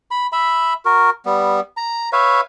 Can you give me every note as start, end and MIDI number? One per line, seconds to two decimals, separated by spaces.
0.11 0.27 83
0.32 0.73 76
0.32 0.73 83
0.85 1.10 66
0.85 1.10 70
1.26 1.60 55
1.26 1.60 59
1.77 2.09 82
2.13 2.41 71
2.13 2.41 73
2.13 2.41 76
2.13 2.41 77